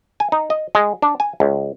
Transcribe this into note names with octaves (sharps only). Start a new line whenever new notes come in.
G#5
D#4
D#5
G#3
D4
G#5
C#2